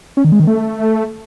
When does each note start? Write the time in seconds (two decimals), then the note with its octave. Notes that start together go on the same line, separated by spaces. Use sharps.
0.17 C#4
0.25 D#3
0.32 G#3
0.40 D#3
0.47 A3